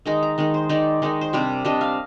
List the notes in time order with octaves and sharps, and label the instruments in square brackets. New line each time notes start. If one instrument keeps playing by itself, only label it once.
[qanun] D#3 G#3 D#4 A#5
A#5
D#3 G#3 D#4
C5
D#3 G#3 D#4 D5
D#3 G#3 D#4
C5
C3 G3 D4 D5
C3 G3 D4 D#5
F5